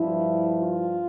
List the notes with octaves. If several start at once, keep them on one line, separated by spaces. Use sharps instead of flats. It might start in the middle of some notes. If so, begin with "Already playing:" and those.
Already playing: G2 F3 E4
F4